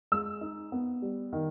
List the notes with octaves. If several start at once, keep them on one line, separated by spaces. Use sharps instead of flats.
G#3 E6
D#4
B3
G3
D#3